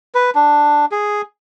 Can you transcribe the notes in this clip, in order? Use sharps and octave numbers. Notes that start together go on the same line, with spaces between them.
B4
D4
G#4